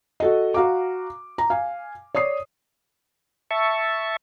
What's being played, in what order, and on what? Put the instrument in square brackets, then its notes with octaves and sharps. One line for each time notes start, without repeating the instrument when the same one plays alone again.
[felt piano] F#4 A4 D#5
F#4 F5 A#5 D6
A#5
F5 G#5
C#5 D5 D#6 C7
[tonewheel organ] E5 A5 C#6